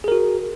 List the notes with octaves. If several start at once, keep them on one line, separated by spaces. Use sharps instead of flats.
F#4 G#4 A#4